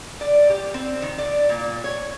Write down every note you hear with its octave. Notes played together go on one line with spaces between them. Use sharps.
D5
G4
C4
D#3
D5
A#2
C#5